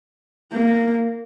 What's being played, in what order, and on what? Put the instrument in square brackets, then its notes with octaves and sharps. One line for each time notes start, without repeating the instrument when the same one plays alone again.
[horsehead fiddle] A#3